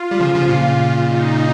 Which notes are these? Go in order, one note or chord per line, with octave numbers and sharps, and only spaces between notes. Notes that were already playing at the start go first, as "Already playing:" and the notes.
Already playing: F4
G3
C#3 F3
C#3 F3
A#2 C#3
D#4